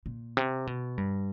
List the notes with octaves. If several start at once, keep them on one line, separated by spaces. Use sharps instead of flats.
A#2
C3
B2
G2